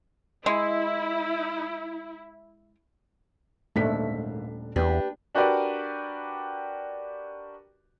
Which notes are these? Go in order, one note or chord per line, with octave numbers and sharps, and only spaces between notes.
G#3 E4
D#1 D#2 G#2 A3 D4 B6
E2 D4 G4 B4
D4 F#4 G4 A#4 B4 D5